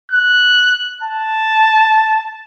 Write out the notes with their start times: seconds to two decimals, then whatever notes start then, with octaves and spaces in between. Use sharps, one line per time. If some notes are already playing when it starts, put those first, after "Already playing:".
0.12 F#6
1.03 A5